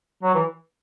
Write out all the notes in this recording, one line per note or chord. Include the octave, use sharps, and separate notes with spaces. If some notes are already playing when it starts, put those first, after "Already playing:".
F#3
E3